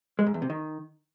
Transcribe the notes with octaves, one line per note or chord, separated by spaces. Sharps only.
G#3
G#2
E2
C3
D#3